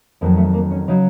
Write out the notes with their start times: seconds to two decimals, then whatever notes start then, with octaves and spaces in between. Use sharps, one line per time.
0.21 F2 D#3 F#3 A#3
0.37 A3
0.54 A#3
0.71 C#4
0.88 C#3 F#3 D#4